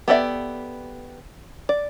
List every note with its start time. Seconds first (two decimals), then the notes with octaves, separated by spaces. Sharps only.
0.08 B3 G4 A4 D5 E5
1.69 D5